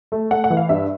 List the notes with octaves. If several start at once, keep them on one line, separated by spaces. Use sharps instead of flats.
A3
A3 F#5
F#5
E3
F5
G2 E5